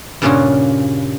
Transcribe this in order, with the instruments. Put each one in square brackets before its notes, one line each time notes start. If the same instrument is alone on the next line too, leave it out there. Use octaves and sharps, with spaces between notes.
[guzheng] G2 A#2 C#3 C#4 F4 F#4